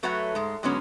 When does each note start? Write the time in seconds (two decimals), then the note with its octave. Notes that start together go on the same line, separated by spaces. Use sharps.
0.03 F#3 A3 F#4 B4 C#5 F#5
0.35 G#2 G#3
0.63 G#2 D3 F#3 G#3 B3 C#4